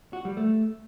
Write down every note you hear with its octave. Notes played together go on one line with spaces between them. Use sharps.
F#4
G3
A3